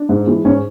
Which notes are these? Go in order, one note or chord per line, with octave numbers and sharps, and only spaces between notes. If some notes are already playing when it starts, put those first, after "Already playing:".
Already playing: D4
G#2
E3 G#3
G#2 C#4